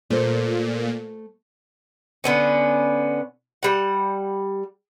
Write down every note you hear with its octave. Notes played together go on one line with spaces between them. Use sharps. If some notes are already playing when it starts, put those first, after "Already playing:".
A#2 A3 C5
D3 B3 C#4
G3 F#5